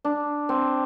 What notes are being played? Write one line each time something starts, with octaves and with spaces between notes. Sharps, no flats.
D4
C4